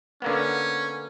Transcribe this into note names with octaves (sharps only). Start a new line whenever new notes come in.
D3 A#3 B3 C#4